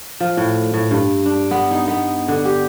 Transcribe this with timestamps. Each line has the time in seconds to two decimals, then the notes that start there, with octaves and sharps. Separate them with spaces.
0.20 F3
0.37 A2
0.74 A2
0.91 G2
1.26 D4
1.51 B3
1.71 D#4
1.88 B3
2.28 D3
2.45 G4